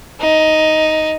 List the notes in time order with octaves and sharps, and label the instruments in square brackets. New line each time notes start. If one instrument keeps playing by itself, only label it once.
[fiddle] D#4